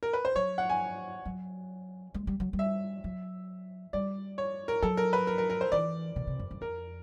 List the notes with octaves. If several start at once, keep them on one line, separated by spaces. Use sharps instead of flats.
A#4
B4
C5
F#3 C#5
F#5
G#5
F#3
G#3
G3
F#3
G3
E5
F#3
G3 D5
C#5
A#4
F#3 A4
A#4
B4
A#4
A#4
A#4
C5
E3 D5
B2
C3
F#2
F#2
F2 A#4